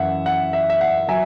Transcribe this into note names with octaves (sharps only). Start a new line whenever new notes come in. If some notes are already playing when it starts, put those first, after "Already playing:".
Already playing: F#2 E3 E5 F#5
F#5
E5
E5
F#5
F#3 E5 G#5